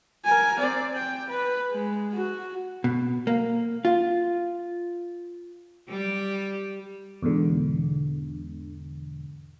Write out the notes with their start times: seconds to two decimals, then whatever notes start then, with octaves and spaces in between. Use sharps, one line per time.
0.24 A#4 G#5
0.59 C4 D5
0.96 G5
1.29 B4
1.71 G#3
2.14 F#4
2.84 B2
3.27 A#3
3.85 F4
5.89 G3 G4
7.23 E2 G#2 B2 D3